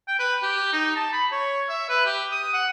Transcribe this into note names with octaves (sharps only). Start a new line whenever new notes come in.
G5
B4
G4
D#4
A5
B5
C#5
E5
B4
G4
D#6
F#5